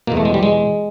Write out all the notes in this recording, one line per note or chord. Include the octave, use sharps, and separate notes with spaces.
E2 B2 A#3
A3
G#3
G3
G#3